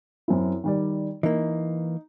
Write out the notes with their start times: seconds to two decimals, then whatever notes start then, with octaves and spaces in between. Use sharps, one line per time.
0.28 F#2 C4 E4
0.64 D#3 G3 D5
1.23 E3 A#3 D#4